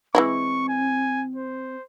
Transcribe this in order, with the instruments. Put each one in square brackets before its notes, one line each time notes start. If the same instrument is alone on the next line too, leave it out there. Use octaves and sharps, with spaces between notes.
[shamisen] E3 G#3 E4 [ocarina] C4 [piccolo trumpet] C#6
[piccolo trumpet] G#5
C5